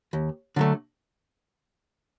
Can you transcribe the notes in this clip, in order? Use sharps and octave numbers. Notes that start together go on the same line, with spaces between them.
D#2
D3 F#3 A3